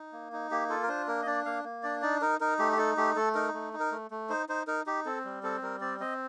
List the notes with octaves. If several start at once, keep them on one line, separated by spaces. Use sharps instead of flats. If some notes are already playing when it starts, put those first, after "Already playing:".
Already playing: D#4
A#3
D#4
A#3 G4
F4 A4
A#4
D4 C5
A#3 A#4
D#5
D4 D5
A#3 F5
A#3
D4 D5
D#4 D5
D#4 A#4
D#4 A#4
A3 G4
G4
D#4 A4
A3 G4
A3 A4
D#4 A#4
A3
D#4
A#4
A3
A3
D#4 C5
D#4 C5
D#4 A#4
D#4 G4
C4 A4
G3
C4 A4
G3 A#4
C4 D5
C4 D#5